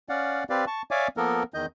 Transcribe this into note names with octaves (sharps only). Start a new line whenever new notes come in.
C#4 D5 F5 F#5
C4 G4 B4 D5 F5
A5 C#6
C#5 D5 E5 F5 G#5 D6
F3 A#3 B3 A4 A#4
E2 D#3 D#5 G6